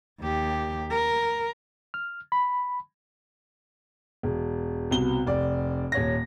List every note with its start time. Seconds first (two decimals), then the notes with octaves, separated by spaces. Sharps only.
0.20 D#2 G4
0.91 A#4
1.94 F6
2.32 B5
4.23 E1
4.91 C2 B2 G7
5.26 F1 D5
5.92 D#1 C#5 A#6